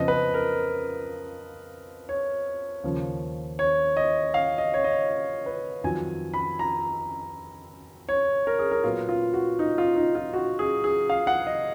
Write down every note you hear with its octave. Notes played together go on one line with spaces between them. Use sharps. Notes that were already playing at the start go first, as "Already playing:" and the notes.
Already playing: F2 C#3 F3 B3 D#5
B4
A#4
C#5
D#2 C#3 F3
C#5
D#5
F5
D#5
C#5
D#5
B4
F2 D#3 F#3 G#5
B5
A#5
C#5
A#4
G#4
A#4
A#2 F#3 B3 F4
F4
F#4
D#4
F4
D#4
F4
F#4
G#4
G#4
F5
F#5
D#5